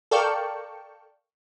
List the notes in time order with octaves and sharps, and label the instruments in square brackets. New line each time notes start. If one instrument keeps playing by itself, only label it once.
[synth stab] A4 A#4 D5 F5 G5 C#6